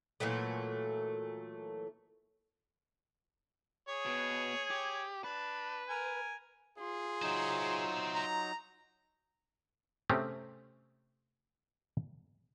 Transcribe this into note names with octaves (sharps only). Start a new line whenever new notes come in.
A#2 E3 F#3 A3
G#4 C#5
B2 B3
G4
D4 B4
A#4 G#5
F4 G#4 C6
F#3 D#4 C5 E5
A#5
C3 A3 C4 C#4 G4 G#4